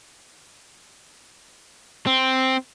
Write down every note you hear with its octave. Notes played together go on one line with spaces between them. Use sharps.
C4